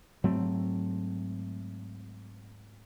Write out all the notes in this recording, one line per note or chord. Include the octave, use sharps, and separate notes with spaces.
G#2 F#3 A3 C4